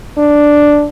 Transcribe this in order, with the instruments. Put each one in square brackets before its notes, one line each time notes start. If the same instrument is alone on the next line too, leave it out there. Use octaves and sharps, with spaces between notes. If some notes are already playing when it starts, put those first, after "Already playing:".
[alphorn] D4